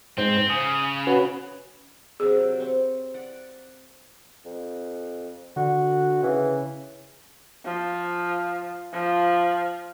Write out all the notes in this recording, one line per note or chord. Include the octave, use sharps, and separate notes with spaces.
G#2 C4 C5
C#3 D#6
C#4 F#4 B4
C3 F#3 D4 G#4
C4 C#6
D5 F#5
F2
D3 F#4
C#3 E3
F3
F3